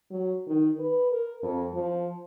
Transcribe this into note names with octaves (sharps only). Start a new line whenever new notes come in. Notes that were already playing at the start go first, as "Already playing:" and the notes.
F#3
D#3
B4
A#4
F2
F3